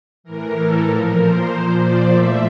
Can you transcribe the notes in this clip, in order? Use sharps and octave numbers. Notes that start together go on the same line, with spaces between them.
A2 E3 A#4
A4
A#2 F3 A#4
C5
A#2 F3
D5
A2 F3 E5